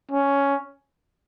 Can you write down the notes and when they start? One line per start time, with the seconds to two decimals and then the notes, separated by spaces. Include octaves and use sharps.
0.12 C#4